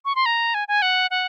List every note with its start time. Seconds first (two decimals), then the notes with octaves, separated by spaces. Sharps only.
0.05 C#6
0.15 C6
0.26 A#5
0.54 G#5
0.68 G#5
0.82 F#5
1.11 F#5